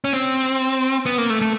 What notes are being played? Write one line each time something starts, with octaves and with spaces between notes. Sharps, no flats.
C#4
C4
B3
A#3
A3
A3